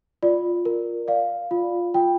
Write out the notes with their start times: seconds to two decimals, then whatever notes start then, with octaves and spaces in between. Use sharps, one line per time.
0.23 F4 D5
0.65 A#4
1.08 D5 F5
1.51 F4
1.94 F4 G5